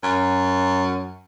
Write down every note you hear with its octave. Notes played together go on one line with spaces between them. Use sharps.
F#2